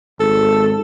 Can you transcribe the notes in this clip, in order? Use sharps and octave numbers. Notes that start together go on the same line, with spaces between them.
G#1 A4